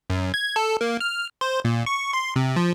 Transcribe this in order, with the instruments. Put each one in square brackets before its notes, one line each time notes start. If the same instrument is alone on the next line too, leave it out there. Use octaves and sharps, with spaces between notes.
[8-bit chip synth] F#2
G#6
A4
A#3
F6
C5
A#2
C#6
C6
C3
F3